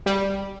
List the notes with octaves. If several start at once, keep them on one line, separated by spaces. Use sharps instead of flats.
G3